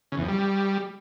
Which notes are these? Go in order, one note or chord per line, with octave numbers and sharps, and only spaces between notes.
C#3
E2
F2
G3